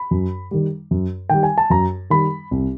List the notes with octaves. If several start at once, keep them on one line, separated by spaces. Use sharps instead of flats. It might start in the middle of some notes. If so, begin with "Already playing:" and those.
Already playing: B5
F#2
D#3 G3
F#2
D#3 G3 G5
G#5
A5
F#2 A#5
D#3 G3 B5
C2